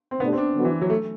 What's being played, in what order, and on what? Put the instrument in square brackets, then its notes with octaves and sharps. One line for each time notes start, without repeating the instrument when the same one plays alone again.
[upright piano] C4
[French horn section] B2 A3 D4 G4 [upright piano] B3
[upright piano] C4
D4
[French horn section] D3 F#3 B3 F#4
[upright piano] E3
F#3
A3